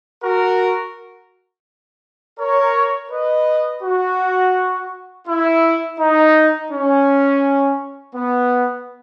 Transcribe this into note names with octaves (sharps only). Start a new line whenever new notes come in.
F#4 A#4
A#4 C#5
B4 D#5
F#4
E4
D#4
C#4
B3